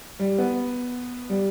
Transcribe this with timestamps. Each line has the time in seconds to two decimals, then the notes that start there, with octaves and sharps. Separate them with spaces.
0.20 G3
0.38 B3
1.30 G3